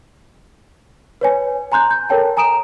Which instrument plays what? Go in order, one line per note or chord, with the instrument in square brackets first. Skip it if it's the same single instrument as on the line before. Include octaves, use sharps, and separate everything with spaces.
[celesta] B4 C#5 G#5
G#5 A#5 C6 F#6 G6
G6
A4 A#4 C#5 G5 A5
G#5 A#5 D#6 D7 E7